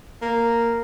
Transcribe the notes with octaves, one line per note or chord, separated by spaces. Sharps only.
A#3